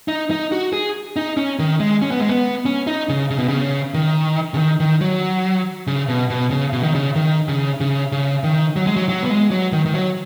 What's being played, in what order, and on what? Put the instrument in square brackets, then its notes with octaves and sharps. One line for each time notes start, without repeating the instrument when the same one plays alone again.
[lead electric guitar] D#4
D#4
F#4
G#4
D#4
C#4
D#3
G#3
C#4
B3
G#3
B3
C#4
D#4
C#3
C#3
B2
C#3
D#3
C#3
D#3
D#3
F#3
C#3
B2
B2
C#3
B2
D#3
C#3
D#3
C#3
C#3
C#3
D#3
F#3
G#3
F#3
F#3
B3
G#3
F#3
D#3
D#3
F#3